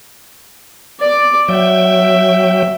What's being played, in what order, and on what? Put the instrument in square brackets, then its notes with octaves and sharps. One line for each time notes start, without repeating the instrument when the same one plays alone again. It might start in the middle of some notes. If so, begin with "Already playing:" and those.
[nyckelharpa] D5 D6
[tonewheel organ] F#3 G5 [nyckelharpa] E5